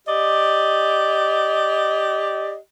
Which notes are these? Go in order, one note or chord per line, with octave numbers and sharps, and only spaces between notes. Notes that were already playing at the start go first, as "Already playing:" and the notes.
G4 D5 D#5